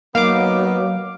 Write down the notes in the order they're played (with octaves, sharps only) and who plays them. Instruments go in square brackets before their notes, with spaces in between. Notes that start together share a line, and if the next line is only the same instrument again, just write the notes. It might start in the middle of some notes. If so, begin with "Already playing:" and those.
[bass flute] F#3 [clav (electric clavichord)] A#3 [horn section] B3 D#4 [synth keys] F5 D6